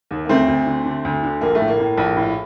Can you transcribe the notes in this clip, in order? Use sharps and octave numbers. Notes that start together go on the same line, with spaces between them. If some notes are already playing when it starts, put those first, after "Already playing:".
D#2
A#3
D2 A3 C4
D2
D3
D3
D2
D3
A#1 A#3
A2 A3
A#3
A2
A#1
A2